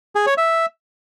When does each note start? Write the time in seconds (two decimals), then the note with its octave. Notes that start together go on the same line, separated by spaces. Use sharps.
0.15 G#4
0.26 C#5
0.38 E5